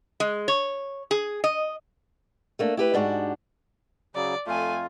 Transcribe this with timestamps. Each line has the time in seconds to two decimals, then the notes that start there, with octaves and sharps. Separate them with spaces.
0.20 G#3
0.48 C#5
1.11 G#4
1.44 D#5
2.59 A3 A#3 D4
2.77 E4 G4 B4
2.94 G#2 D4 F#4 G4
4.15 C#3 F#3 D5
4.47 F2 A3 F4 G#5